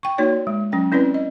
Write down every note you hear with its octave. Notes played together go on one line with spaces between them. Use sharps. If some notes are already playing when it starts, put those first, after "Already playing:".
G5 C#6
A#3 D#4 F#4 C#5 D5
G#3
F#3 C#4 G5
C4 C#4 E4 B4 D5
D#5